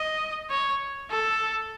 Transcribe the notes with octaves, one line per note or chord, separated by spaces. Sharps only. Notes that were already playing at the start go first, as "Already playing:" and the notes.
Already playing: D#5
C#5
A4